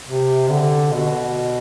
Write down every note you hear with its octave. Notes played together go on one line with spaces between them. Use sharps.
C3
D3
B2